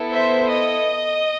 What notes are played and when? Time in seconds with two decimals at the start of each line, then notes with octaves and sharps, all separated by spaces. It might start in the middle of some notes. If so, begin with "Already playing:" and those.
Already playing: B3 E4 A4
0.12 C5 E5
0.50 D#5